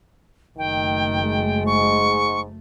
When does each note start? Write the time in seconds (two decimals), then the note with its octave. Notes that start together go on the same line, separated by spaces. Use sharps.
0.58 F#1 D#3 A3 G5
1.23 G#3
1.66 G#2 C#6